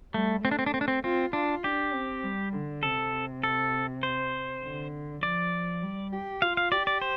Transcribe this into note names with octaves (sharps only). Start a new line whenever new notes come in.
G3 A3
A3 C4
D4
C4
D4
C4
D4
C4
C4 F4
D4 F4
D4 G4
C4
G3
D3
C3 A4
A4
C5
D3
F3 D5
G3
G4
F4 F5
F5
G4 D5
D5
C5